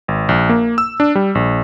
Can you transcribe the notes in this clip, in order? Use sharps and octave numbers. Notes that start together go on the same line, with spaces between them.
G#1
A#1
A#3
E6
D4
G3
A#1